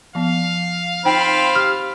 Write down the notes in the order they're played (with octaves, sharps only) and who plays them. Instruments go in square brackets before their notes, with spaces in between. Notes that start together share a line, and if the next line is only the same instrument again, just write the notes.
[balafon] F3 B3 [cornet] F5
[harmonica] C4 F4 B5 [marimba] D#4 G5 [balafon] C5
[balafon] G4 [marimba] F6